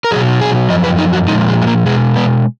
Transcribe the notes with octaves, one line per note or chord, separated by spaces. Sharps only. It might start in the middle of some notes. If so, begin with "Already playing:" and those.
A#4
B2 F#3 G#4
G#4
F#2 F3 D#5
B4
D#4
F#4
A#2 F3 G#3 D#4
G#3
G#3
A#3
B2 G#3 G#4
B3